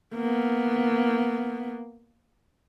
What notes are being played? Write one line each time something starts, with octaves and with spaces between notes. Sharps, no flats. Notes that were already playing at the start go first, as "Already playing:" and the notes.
A#3 B3